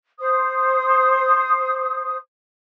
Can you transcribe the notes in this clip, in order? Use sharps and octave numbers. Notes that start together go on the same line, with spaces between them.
C5 D#6